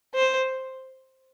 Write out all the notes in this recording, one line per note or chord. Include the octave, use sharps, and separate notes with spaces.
C5